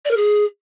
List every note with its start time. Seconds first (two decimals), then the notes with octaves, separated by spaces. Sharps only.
0.05 D5
0.10 A#4
0.16 G#4